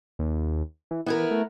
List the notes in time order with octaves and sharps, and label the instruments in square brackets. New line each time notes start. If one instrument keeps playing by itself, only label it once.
[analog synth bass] D#2
E3
[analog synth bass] E3 [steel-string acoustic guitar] B3 E4 A#4
[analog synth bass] A3